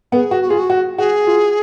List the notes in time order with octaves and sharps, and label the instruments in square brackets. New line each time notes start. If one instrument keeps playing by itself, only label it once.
[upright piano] B3 [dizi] A#4
[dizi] G#4
[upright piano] F#4
[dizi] F#4
[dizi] F4 [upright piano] G#4
[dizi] F#4
[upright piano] F#4
[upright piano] F#4 [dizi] G#4
[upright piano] F4